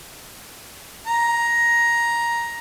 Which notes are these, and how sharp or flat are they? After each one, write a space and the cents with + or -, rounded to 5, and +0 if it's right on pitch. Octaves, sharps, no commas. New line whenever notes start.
A#5 +10